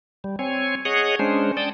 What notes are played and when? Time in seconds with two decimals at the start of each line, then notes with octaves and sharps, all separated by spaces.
0.24 G3
0.39 C4 C#5 G#5
0.85 G#4 C#5 D#5 F#5
1.19 G#3 C#4 D4 C5
1.57 D5 G5 A5 D#6